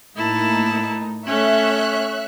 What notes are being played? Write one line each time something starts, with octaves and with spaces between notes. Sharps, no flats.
A2 A#3 D#4 E4 A5
A3 C#4 C#5 E5 F#6